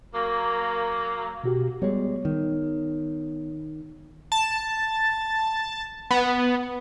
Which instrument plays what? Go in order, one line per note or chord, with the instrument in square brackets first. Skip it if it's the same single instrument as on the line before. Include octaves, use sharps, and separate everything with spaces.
[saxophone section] F#3 A#3
[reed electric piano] B2 F#4 G4
[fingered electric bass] G3 G#3 [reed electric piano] B3 C#5
[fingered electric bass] D#3
[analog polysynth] A5
B3